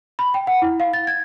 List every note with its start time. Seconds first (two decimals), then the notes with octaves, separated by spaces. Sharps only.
0.19 B5
0.34 G5
0.47 F#5
0.62 E4
0.80 F5
0.93 A6
1.07 G#6